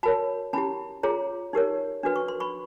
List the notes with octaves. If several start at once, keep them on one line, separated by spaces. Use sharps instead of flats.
F#4 A#4 C#5 A5 B5
C#4 E4 G4 A5 B5
F4 G#4 C#5 A#5 C6
D#4 G4 A#4 C#5
D4 F#4 B4
C#6
C6
B5 C#6